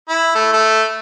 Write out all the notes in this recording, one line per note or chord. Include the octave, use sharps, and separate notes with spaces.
E4
A3
A3